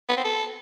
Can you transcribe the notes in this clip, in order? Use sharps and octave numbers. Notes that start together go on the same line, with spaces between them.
B3
C4
A4